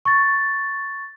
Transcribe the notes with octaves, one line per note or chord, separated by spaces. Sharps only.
C#6 A6